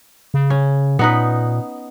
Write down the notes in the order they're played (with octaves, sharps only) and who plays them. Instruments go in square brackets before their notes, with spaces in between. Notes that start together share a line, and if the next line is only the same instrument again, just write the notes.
[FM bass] C#3
[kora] C#4
[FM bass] A#2 [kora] B3 D#4 B4